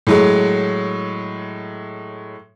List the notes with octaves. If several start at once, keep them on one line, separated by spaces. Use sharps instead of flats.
A2 F#3 G#3